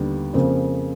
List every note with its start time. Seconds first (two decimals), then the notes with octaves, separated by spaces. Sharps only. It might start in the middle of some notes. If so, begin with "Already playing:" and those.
Already playing: D#2 D3 G3 B3 D4
0.34 F2 C#3 F3 A#3